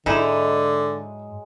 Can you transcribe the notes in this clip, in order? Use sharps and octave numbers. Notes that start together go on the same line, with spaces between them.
G#2 D3 F#3 G#3 D#4 E4 C6